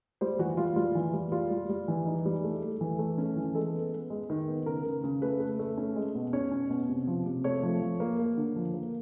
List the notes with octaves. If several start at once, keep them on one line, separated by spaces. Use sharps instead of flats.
G3 C5
E3 F#4
G3 F4
G3 F4
E3
G3
G3 F4
G3
G3
E3
D#4
G3
A3
A3
E3
A3
C#4
E3
G#3 A4
B3
B3
G#3
D#3
B3
C#3 A#4
C#3
C#3
A3 B4
A3
A3
C#4
G#3
B2
C#4 C#5
C#4
B2
C3
F3
C3
A3 C#5
F3
F3
A#3
A#3
D3
F3
A#3